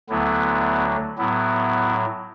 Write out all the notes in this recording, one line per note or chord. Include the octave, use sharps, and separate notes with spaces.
D2 D3 F#3 B3 E4
A2 F#3 B3 E4